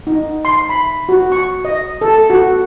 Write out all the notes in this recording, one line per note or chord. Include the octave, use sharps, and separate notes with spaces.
D#4
C6
B5
F#4
C#6
D#5
A4
F#4